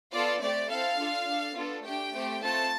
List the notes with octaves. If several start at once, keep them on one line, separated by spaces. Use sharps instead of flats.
B3 F4 A4 D5
A3 C4 G4 D5
C4 E4 A4 F5
D4 F4 A4
D4 A4
B3 D4 F4 A4
A3 D4 G4 G5
A3 C4 G4
A3 C4 F4 A4 A5